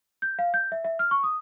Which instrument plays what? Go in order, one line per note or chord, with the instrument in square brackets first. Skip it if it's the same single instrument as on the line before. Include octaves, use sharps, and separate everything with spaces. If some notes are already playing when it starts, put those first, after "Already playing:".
[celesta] G6
F5
G6
E5
E5
F6
C#6
D#6